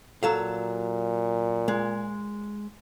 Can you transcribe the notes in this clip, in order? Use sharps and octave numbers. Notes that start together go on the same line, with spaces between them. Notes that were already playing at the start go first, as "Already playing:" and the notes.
A#2 F#3 A4 F5
G#3